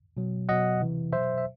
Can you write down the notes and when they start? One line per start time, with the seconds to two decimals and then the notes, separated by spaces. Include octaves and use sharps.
0.17 B2 F#3
0.49 B2 F#3 D#5 F#5
0.81 C3 E3
1.12 B2 F#3 C5 E5
1.38 E5